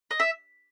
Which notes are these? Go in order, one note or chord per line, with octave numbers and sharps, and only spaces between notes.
D#5
E5